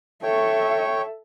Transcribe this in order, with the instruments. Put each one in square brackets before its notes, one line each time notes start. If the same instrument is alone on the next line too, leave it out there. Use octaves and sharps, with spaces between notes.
[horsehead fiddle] A4 E5 [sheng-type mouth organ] C#5 G5 C#6